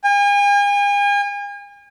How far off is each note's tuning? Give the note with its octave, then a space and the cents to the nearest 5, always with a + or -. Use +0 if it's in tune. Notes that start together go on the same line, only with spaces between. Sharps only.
G#5 -40